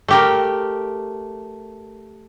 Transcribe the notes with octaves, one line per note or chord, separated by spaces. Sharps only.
A3 G4 A#4